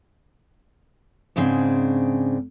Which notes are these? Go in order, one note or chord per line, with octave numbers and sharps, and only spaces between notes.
G#2 C#3 G#3 C4 D4